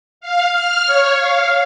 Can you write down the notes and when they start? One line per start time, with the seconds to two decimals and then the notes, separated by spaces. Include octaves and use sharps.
0.21 F5
0.49 F6
0.84 C#5
1.17 F5